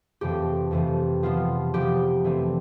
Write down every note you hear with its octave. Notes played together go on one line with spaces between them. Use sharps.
F2 C3 E3 A3 C4 G4
F2 C3 E3 A3 C4
C3 F3 B3 F4
C3 F3 B3 G4
C3 E3 A3 C4